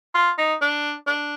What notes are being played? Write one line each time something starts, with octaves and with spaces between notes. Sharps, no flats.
F4
D#4
D4
D4